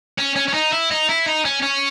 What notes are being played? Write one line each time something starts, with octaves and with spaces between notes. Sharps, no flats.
C#4
C#4
C#4
D#4
E4
D#4
E4
D#4
C#4
C#4